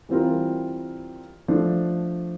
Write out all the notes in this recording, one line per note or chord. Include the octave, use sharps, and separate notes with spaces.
E3 G3 C4 F4 A#4
F3 A3 D4